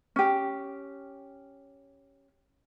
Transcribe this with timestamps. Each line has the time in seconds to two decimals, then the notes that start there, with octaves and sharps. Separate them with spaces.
0.16 C#4 G4